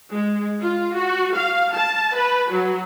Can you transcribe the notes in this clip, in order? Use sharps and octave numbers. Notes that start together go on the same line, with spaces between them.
G#3
F4
F#4
F5
A5
B4
F#3